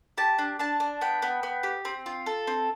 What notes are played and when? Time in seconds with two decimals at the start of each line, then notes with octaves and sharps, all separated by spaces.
0.17 G4 A5
0.38 D4
0.59 D4 A5
0.80 D4
1.01 B3 G5
1.22 B3
1.43 B3
1.63 G4
1.85 C4
2.06 F4
2.26 A4
2.47 C4